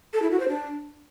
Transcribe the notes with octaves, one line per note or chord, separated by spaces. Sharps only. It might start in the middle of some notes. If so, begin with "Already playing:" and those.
A4
E4
F#4
C5
D4